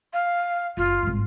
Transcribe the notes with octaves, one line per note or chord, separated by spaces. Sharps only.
F5
F#1 F4
G#1 G2